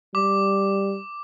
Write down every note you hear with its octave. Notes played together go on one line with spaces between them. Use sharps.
G3 D6